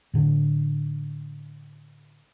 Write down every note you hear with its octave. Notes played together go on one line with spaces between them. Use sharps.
A2 D3 D4